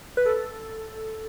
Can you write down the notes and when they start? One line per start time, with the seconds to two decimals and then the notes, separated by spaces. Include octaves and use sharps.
0.17 B4
0.26 A4